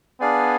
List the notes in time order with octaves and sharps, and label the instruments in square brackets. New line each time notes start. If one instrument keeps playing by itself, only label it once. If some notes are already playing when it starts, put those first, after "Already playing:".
[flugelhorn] B3 [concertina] D4 G#4 D5 F5 G#5